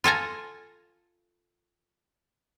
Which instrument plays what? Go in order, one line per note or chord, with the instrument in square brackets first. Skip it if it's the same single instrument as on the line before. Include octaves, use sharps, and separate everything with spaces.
[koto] F4 A4 G#5 A#5